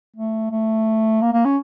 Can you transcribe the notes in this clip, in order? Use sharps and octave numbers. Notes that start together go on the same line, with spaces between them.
A3
A3
A#3
A#3
C#4